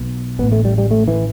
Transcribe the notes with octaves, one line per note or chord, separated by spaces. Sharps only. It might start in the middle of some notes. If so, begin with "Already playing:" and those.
Already playing: B1 B2
A1 A2 B3
A3
G3
G3
A3
E3